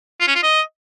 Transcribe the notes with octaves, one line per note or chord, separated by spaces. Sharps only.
F4
C#4
F4
D#5